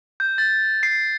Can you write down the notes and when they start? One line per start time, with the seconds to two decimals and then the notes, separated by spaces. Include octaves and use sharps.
0.20 G6
0.38 A6
0.83 C7